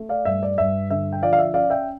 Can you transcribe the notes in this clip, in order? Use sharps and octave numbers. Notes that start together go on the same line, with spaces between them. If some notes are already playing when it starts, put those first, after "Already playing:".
Already playing: A3
D5 F5
G2 E5
D5
G2 E5
D3 E5
G5
F3 D5 F5
F5
E5
C#4 D5 F5
E5 G5